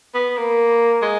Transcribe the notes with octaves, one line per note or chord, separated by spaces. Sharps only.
B3
A#3
G#3